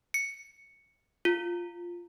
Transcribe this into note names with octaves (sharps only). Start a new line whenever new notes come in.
C#7
F4